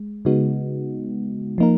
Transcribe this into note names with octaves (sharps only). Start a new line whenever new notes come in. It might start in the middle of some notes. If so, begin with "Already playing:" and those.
Already playing: G#3
C#3 G#3 B3 D#4 F#4
F3 A#3 D#4 A#4